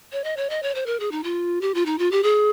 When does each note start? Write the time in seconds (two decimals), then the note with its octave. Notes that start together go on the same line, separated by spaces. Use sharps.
0.12 C#5
0.24 D#5
0.37 C#5
0.50 D#5
0.63 C#5
0.75 C5
0.86 A#4
1.00 G#4
1.12 D#4
1.23 F4
1.61 G4
1.74 F4
1.86 D#4
1.99 F4
2.11 G4
2.23 G#4